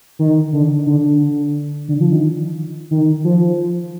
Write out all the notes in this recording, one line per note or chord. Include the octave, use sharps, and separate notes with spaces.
D#3
D3
D3
D3
F3
D#3
D#3
F3